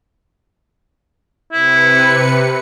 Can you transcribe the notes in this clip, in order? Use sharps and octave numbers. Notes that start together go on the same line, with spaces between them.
C3 E4 B4 C#7